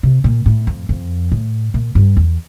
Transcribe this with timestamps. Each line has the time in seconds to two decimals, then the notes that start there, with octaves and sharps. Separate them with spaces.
0.03 C3
0.24 A#2
0.46 A2
0.67 F2
0.89 F2
1.32 A2
1.74 A#2
1.95 G2
2.17 E2